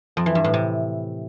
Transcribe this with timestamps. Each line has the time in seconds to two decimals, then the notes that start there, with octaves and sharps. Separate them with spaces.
0.17 F2
0.26 E3
0.35 G2
0.44 A2
0.54 C3